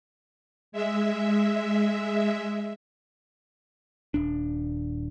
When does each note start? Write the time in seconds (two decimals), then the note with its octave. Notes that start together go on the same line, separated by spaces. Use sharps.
0.72 G#3 E5
4.14 D#1 D4